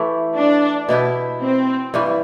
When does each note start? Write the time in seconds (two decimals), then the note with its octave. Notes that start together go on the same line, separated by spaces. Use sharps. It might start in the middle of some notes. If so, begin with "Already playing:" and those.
Already playing: E3 A3 E4 G4
0.36 D4
0.89 B2 B3 E4 G4
1.41 C4
1.94 G2 E3 G3